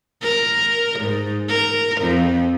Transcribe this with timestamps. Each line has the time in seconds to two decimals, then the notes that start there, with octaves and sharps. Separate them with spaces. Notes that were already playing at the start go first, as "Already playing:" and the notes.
0.22 A#4
0.99 G#2
1.49 A#4
2.01 F2